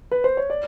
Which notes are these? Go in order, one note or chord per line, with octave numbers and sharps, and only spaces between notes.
B4
C5
C#5
D5